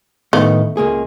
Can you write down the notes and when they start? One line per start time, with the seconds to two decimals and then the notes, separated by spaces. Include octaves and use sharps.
0.33 A2 D#3 A3 B3
0.77 C#2 A#3 G#4